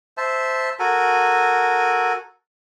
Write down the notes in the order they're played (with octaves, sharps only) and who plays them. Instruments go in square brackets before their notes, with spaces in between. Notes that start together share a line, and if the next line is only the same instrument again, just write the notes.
[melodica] C5 E5 A5
F#4 A4 A#4 G#5